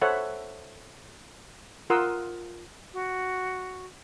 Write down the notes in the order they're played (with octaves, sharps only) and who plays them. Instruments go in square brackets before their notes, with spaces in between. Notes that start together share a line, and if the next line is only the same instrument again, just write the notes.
[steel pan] A4 C5 C#5 E5 F#5 B5
F4 A#4 F#5 C6 D#6 E6
[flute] F#4